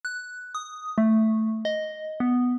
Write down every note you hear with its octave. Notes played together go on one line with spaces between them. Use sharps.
F#6
D#6
A3
D#5
B3